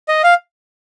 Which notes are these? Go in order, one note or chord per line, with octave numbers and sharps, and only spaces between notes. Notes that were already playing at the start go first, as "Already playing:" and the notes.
D#5
F5